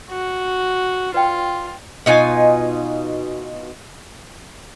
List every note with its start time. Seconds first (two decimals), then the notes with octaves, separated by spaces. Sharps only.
0.11 F#4
1.14 F4 B4 D5 G5
2.06 B2 D#4 F4 G#5